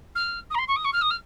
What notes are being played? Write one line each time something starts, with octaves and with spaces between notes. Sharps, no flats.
F6
D#6
A#5
C6
C#6
D#6
C#6
F6
D#6
F6